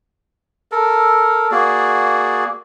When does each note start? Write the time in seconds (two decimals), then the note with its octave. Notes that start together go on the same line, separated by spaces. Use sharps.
0.72 A4 A#4
1.51 A#3 F#4 G#4 D5